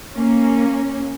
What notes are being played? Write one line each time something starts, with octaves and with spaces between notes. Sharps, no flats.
A#3 C#4